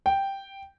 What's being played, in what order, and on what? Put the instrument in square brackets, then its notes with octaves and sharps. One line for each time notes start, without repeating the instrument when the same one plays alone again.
[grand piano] G5